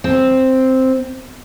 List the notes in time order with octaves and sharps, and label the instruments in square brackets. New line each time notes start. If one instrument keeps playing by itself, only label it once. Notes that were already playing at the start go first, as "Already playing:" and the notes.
[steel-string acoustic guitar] C4